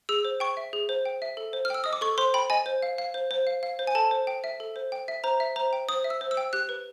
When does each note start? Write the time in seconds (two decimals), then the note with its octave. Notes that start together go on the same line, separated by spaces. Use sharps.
0.09 G#4 E6
0.25 C5
0.40 G5 C#6
0.57 E5
0.73 G#4
0.89 C5
1.05 G5
1.22 E5
1.37 A4
1.53 C5
1.65 F6
1.70 G5 E6
1.84 D#5 D#6
1.93 D6
2.01 A4 C#6
2.18 C5 C6
2.34 G5 B5
2.50 D#5 G#5
2.66 C5
2.82 F5
2.98 F5
3.14 C5
3.31 C5
3.47 F5
3.63 F5
3.79 C5
3.87 G#5
3.95 A4 A5
4.11 C5
4.27 G5
4.44 E5
4.60 A4
4.76 C5
4.92 G5
5.08 E5
5.24 C5 A#5
5.40 E5
5.56 C5 A#5
5.73 G5
5.89 C5 D#6
6.04 E5
6.10 E6
6.21 C5
6.31 E6
6.37 G5
6.53 G4 F#6
6.69 B4